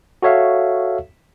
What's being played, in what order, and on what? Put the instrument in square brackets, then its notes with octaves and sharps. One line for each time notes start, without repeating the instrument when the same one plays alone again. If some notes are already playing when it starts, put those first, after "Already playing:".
[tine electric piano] F#4 A4 C#5 E5 F5